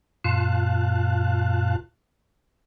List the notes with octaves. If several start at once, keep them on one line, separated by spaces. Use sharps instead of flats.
F#2 A#2 F4 F5 A5 F#6